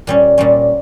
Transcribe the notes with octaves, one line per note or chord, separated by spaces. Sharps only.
A#2 G3 C#4
A#2 G3 C#4